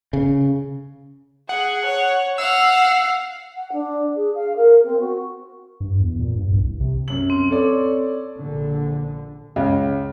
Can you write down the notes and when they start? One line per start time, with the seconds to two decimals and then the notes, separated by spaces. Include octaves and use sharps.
0.13 C#3
1.49 G#4 F#5
1.85 C#5
2.38 F5 F#5 E6
3.55 F#5
3.72 D4
4.15 G#4
4.34 F5
4.56 A#4
4.83 C4
4.99 F#4
5.80 G2
6.00 E2
6.19 A#2
6.35 G2
6.52 C2
6.64 C2
6.80 C3
7.08 F#2 F#7
7.30 C4
7.50 A4 C#5 D5
8.39 A#1 D3
9.56 C#2